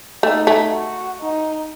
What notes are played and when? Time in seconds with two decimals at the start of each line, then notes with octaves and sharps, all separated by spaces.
0.23 A3 D#4
0.47 A3
0.72 F#4
1.21 D#4